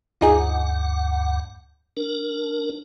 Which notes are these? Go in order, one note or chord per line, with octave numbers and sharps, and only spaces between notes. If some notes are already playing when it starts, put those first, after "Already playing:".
D2 G2 F3 D#4 G#4 F#5
D4 A#4